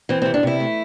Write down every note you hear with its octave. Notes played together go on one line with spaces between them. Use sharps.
E3 C4
C4
C3
D4
C3 E4
A3